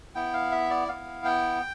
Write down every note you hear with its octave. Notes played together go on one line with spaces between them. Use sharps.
B3 E4 G5
F5
E5
D5
B3 E4 F5
G5